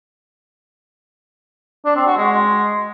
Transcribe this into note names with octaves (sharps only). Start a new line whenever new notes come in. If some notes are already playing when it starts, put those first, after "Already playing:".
D4
C4
F#4
G#3